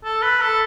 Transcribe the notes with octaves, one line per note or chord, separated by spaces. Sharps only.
A4
B4
A4